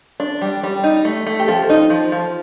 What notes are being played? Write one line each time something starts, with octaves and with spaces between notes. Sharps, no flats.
D4
G3
G3
D#4
A3
A3
G4
F3 A4
D#4
F3
F3